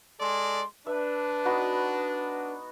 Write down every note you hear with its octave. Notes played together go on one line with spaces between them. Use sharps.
G#3 A4 D5 C6
D4 B4 E5
B3 D#4 F#4